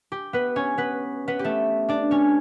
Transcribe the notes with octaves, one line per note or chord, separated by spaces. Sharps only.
G4
B3 B4
C#4 C#5
B3 B4
B3 B4
G4
A3 A4
D4 D5
C#4 C#5